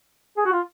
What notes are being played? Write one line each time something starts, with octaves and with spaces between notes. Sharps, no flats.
G#4
F#4
F4